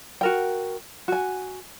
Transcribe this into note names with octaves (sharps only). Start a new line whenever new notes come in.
F#4 A#4 G5
F#4 G#5